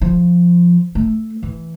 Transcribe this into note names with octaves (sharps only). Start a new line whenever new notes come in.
F3
A3
E3